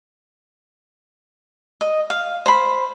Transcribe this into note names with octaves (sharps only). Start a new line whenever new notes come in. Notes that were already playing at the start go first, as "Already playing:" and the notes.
D#5
F5
C5 B5